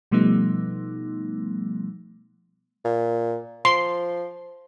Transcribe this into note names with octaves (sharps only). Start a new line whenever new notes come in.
B2 F3 G3 A3 B3 D#4
A#2
F3 C6